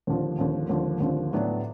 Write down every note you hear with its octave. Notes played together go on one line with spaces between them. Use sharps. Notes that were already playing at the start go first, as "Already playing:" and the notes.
D#2 D3 F3
D#2 D3 F3
D#2 D3 F3
D#2 D3 F3
A2 F#3 B3 D4